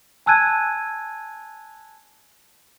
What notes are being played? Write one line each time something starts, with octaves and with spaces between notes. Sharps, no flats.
G#5 A5 E6 F#6 G#6 D#7